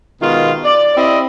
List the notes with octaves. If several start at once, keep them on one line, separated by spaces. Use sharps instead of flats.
B2 D#3 G#3 F4
D5
C4 E4 G4 D5 D#5